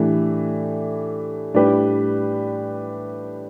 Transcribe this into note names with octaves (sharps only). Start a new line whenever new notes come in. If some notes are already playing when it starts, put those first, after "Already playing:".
Already playing: A2 E3 A3 D4 G4
A2 G3 D4 G4 B4